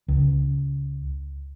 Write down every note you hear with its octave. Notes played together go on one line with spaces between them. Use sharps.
C#2